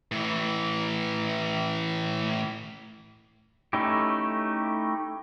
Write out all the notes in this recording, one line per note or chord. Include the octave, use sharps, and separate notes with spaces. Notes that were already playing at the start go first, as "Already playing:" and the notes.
A2 E3
A3 C#4 D#4 E4 G4